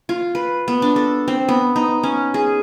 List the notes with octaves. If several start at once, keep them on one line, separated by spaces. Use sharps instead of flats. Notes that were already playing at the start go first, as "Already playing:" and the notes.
F4
B4
B3
D4
A4
C4
B3
D#4
C#4
G#4